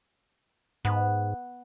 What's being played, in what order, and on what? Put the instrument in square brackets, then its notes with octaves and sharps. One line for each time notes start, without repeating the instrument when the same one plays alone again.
[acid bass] G#2 [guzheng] B3